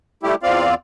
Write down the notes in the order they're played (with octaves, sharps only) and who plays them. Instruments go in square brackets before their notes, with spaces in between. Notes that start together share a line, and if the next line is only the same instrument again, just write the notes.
[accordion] G3 A3 E4 G4
E2 C4 F4 D5 F5